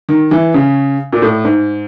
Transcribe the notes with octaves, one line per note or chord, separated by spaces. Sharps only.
D#3
E3
C#3
A#2
A2
G#2